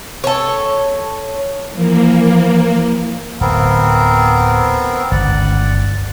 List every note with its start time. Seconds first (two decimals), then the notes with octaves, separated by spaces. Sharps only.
0.24 A4 C#5
1.74 E3 F3 A#3
3.41 D1 B3 C4 A#4
5.11 G1 C#2 D5 F#5